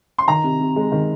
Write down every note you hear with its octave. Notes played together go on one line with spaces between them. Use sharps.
C6
D#3 A#5
C3
C3
G#3
D#3